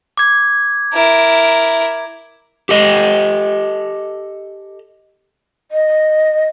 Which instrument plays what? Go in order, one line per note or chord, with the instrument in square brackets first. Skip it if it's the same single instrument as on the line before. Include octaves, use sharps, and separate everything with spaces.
[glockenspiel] D6 G#6
[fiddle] E4 A#4
[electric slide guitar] G4 A4 D#5
[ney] D#5